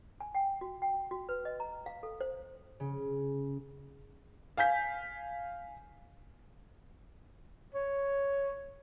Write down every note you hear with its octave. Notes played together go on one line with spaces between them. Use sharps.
G#5
G5
F#4
G5
F#4
B4
D#5
A#5
F5
A4
C5
C#3
F5 G#5 G6 B6
C#5